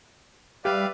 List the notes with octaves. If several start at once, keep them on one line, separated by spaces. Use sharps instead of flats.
G3 G4 B4 D5 E5 F5